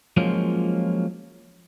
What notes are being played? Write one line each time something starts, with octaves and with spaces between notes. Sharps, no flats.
F3 F#3 G#3 A#3 C#4 F4